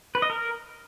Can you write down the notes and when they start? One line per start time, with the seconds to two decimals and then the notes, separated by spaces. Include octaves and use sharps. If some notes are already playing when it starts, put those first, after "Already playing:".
0.15 B4
0.22 D#5
0.30 A#4